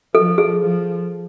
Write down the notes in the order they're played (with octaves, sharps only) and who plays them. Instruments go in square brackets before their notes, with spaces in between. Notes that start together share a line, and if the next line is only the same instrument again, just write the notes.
[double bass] F3 [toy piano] A4
[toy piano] G#4
[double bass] F3